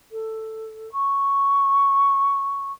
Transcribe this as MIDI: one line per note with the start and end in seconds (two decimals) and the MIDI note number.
0.12 0.92 69
0.92 2.72 85